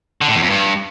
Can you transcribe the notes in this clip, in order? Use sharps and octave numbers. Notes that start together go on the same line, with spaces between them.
D3
A2
E2
F2
G2